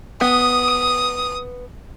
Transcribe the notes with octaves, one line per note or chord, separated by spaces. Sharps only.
B3 D#6